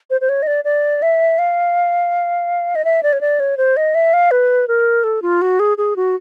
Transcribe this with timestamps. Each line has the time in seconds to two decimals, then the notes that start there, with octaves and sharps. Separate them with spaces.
0.10 C5
0.21 C5
0.29 C#5
0.43 D#5
0.47 D5
0.65 D5
1.02 E5
1.39 F5
2.75 D#5
2.85 E5
3.03 D5
3.13 C#5
3.21 D5
3.40 C#5
3.57 C5
3.77 D#5
3.95 E5
4.13 F5
4.31 B4
4.68 A#4
5.04 A4
5.22 F4
5.42 F#4
5.60 G#4
5.78 G#4
5.96 F#4